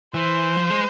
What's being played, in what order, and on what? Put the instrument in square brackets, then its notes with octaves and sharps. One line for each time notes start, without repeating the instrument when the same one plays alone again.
[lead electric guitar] E3 [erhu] C5
[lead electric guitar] F3
G#3